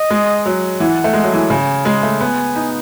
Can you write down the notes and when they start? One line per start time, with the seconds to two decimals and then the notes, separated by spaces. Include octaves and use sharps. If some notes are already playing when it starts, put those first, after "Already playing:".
Already playing: D#5
0.11 G#3
0.46 F#3
0.80 E3 F#5
1.04 A3
1.14 G#3
1.23 F#3
1.33 E3
1.50 C#3 G#5
1.85 G#3
2.03 A3
2.20 B3 G#5
2.56 D#4